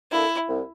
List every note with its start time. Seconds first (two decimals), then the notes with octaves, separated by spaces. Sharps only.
0.11 A#3 D4 E4 A4
0.48 C2